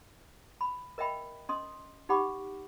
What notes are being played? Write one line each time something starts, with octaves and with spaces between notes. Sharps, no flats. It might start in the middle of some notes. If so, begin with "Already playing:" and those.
B5
A#4 D#5 E5 G5 B5
C#4 D#5 C6 D#6
D#4 G4 F#5 B5 C#6 D6